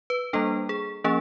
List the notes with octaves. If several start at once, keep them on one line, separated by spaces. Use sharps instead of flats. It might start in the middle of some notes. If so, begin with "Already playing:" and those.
B4
G3 A#3 D4 A4
G#4
F3 A#3 C#4 G#4